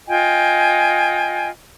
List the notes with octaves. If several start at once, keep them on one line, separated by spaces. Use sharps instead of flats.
F4 D#5 G5 G#5